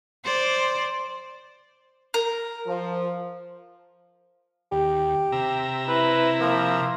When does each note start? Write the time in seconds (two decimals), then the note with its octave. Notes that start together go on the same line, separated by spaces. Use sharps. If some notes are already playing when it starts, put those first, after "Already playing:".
0.24 C5 D5
2.14 A#4
2.67 F3
4.72 D#2 G4
5.32 C3 E5 A#5
5.88 E4 B4
6.40 F3 A#3